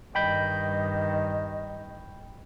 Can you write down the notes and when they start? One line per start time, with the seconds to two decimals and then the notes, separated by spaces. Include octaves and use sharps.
0.15 G2 D#3 D#5 G5 B5 G6